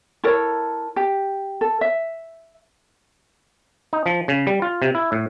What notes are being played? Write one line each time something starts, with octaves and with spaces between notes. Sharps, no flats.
E4 A4 A#4 C#5
G4
A4
E5
D#4
F3
C#3
G3
F4
C3
E4
A2